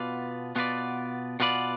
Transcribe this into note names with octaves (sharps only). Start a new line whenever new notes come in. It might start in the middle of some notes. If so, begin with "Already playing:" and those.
Already playing: B2 B3 F4 B4 D5
B2 B3 F4 B4 D5
B2 B3 F4 B4 D5